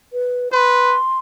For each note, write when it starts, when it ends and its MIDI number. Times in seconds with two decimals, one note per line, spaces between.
0.13 0.49 71
0.52 0.97 71
0.52 1.19 84